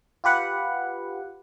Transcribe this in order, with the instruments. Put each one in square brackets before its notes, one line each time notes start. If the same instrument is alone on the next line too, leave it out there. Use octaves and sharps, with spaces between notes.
[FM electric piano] F4 G4 B4 F#5